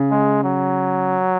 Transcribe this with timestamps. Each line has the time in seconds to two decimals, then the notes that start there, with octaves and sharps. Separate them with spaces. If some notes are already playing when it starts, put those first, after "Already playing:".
Already playing: C#3
0.11 G#3
0.44 F#3